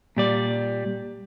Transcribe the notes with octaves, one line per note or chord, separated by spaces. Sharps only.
A#2 G3 D5